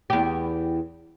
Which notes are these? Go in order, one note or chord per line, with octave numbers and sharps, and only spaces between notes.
E2 G4